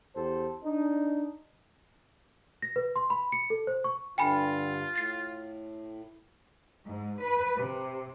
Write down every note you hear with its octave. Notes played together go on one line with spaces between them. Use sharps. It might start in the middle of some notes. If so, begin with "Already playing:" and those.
E2 G4 A4 C5
D4 D#4
A#6
B4
C6
B5
C#7
A4
C5
C#6
G2 D3 F4 G5 G#5 B5
A2 A6 C7
G#2
B4
C3